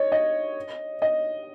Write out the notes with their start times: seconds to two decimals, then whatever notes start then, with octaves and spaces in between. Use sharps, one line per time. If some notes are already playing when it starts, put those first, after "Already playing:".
Already playing: C#5 D#5
0.12 D#5
1.02 D#5